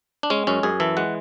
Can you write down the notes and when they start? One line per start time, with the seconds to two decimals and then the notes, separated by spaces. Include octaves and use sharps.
0.23 D4
0.30 G#3 C#4
0.47 F#2 C#4
0.63 F#2 G#4
0.80 E3 A4
0.97 G#3 F#5